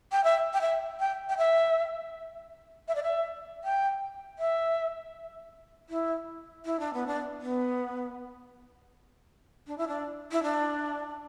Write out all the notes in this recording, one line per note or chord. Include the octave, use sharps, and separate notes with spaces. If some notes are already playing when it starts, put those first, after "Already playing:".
G5
E5
G5
E5
G5
G5
E5
E5
D5
E5
G5
E5
E4
E4
D4
B3
D4
B3
D4
E4
D4
E4
D4